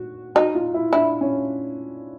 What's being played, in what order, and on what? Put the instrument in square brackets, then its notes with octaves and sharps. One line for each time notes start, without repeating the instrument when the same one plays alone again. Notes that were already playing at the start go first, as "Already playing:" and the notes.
Already playing: [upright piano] F#4
[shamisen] D#4 [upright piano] F#4
[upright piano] F4
E4
[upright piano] D4 [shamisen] E4
[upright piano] C#4